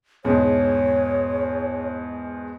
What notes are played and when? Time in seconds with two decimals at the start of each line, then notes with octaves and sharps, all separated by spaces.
0.25 E2 G#2 B2 C#5